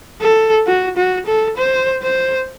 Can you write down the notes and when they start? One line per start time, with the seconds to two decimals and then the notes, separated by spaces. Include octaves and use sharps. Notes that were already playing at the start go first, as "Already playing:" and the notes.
0.21 A4
0.67 F#4
0.97 F#4
1.27 A4
1.57 C5
2.02 C5